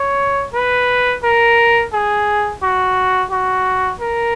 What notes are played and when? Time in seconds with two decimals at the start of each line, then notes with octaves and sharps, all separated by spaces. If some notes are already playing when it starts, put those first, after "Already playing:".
Already playing: C#5
0.54 B4
1.23 A#4
1.93 G#4
2.62 F#4
3.31 F#4
4.00 A#4